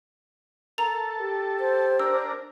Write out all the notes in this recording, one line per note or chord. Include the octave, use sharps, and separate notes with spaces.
A4 A#4 A#5 F7
G4
C5
D4 A#4 E6